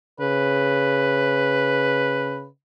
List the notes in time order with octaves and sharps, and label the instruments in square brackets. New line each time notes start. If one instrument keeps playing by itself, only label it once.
[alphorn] C#3 [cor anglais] B4